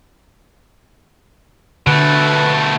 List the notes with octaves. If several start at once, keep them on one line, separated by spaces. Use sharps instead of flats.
B2 D3 A3 B4